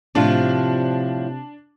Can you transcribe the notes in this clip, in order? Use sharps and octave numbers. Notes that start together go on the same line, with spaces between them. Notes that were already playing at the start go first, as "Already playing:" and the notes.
A2 C3 F3 D4 F4